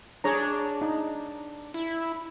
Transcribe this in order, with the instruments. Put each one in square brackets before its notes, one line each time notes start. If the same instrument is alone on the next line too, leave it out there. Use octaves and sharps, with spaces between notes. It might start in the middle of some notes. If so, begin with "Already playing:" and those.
[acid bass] D4 [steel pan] G#4 C#5 A#5
[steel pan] D#4
[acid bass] E4